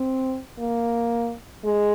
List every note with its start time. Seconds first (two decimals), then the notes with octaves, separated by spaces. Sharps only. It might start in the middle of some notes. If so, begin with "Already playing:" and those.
Already playing: C4
0.59 A#3
1.65 G#3